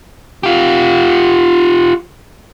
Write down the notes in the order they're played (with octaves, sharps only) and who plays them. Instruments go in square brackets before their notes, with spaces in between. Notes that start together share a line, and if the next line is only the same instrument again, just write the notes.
[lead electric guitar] F4 G4